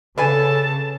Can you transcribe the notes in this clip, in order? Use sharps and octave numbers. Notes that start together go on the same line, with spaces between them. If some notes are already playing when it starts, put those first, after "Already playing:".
C#3 D4 A4 B4 G#5 A5